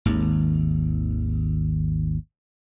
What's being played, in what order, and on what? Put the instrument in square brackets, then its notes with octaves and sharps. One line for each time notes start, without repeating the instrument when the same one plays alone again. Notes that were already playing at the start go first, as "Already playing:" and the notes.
[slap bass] G#1 D#2